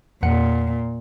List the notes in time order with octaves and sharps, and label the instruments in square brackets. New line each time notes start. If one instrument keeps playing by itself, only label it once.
[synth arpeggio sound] E2 F#5 C#7 [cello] A#2